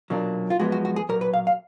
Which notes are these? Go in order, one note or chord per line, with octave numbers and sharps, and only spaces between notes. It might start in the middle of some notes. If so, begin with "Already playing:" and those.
B1 A#2 F#3 A#3 D4
F4
F#2 F3 G#3 B3 F#4
F#4
F#4
G#4
B1 A#2 F#3 A#4
B4
F5
F5